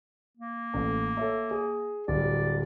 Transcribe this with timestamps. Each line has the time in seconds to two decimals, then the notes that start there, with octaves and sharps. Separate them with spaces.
0.37 A#3
0.74 A1 A3
1.17 A4 C#5 E5
1.51 G#4
2.08 D1 G3 D5